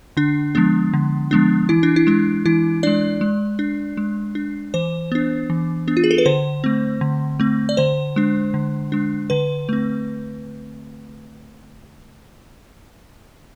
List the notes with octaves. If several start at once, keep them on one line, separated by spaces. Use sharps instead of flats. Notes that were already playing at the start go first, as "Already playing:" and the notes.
D3 D4
F3 G#3 B3 D4
D3
F3 G#3 B3 D4
E3 E4
D4
E4
G#3 D4
E3 E4
G#3 D4 D5
G#3
D4
G#3
D4
E3 C5
B3 D4
E3
B3 D4
F4
G#4
A4
B4
D3 C5
A3 C4
D3
A3 C4
D5
D3 C5
G#3 D4
D3
G#3 D4
D3 B4
A3 C4